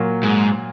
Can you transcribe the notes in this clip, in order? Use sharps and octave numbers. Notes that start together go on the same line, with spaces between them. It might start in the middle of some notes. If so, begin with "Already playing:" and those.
Already playing: A#2 F#3 A#3
G#2